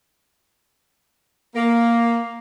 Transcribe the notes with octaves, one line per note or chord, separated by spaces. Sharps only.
A#3